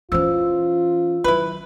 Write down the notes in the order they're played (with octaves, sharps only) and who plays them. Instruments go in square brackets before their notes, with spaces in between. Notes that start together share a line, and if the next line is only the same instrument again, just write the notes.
[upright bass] E3 C#4 [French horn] F4 [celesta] C5 E6
[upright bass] D#3 F#3 [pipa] E4 B4